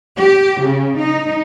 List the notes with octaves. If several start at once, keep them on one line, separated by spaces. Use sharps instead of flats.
G4
C#3
D#4